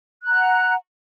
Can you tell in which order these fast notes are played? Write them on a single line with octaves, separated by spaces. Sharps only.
F#6 A#5 F#5